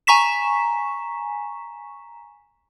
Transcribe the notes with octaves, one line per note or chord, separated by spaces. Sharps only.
G#5 A#5 C#6 B6 E7